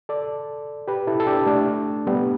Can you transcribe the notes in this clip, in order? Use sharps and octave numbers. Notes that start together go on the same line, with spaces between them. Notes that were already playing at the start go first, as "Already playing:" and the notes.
A4 D5
G4 B4
E4 A4
A4
D4 G4
A3 D4
G3 B3